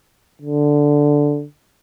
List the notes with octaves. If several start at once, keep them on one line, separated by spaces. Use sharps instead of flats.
D3